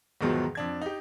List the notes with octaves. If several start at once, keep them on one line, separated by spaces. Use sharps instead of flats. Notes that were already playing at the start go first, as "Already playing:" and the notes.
E2 G#2 B2 D#3 F3 F#3
F2 D4 G#6
D#4 G4